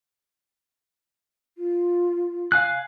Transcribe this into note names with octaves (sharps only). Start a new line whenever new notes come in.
F4
F5 G#5 F#6